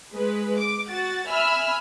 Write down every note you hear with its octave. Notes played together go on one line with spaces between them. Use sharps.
G#3 B4
D6
F#4 A6
E5 G#5 B5 E6 F6